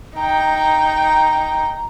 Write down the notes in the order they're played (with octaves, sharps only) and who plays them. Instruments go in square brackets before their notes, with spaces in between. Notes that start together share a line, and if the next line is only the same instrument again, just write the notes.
[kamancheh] D#4 G5 [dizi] A#5